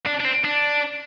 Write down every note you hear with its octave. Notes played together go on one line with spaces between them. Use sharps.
D4
D4
C4
D4